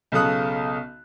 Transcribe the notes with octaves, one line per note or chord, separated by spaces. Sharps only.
B1 C#3 A4 D#6 F#6